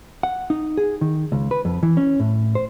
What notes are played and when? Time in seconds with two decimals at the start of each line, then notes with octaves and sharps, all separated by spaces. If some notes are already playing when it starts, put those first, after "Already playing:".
0.23 F#5
0.50 D#4
0.77 G#4
1.01 D#3
1.32 C#2
1.51 B4
1.65 F2
1.83 E3
1.97 C#4
2.20 A2
2.55 C5